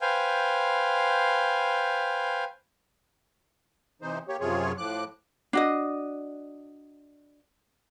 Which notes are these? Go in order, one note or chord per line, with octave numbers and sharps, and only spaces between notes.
B4 C5 F5 G5 G#5
C3 E3 D#4 C5
A#3 G4 C#5
F#2 C3 F3 F4 G#4 C#5
A2 F3 D6 F#6
D4 F#4 D#5